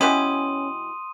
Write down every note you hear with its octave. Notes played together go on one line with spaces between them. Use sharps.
B2 E3 C#4 G4 C6 D#6 D#7